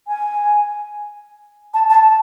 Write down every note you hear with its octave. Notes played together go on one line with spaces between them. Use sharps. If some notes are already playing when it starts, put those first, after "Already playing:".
G#5
A5
A5